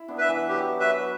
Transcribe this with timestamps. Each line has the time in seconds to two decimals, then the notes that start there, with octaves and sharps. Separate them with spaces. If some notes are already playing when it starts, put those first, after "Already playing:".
Already playing: E4
0.08 B3 D4
0.18 B4 E5
0.29 E3
0.49 F#3 G4
0.80 F#3 B4 E5